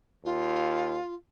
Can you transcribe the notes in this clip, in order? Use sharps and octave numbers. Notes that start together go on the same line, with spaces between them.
D#2 F4